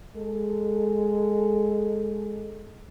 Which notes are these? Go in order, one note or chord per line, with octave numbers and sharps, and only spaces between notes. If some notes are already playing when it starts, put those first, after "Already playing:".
G#3 A4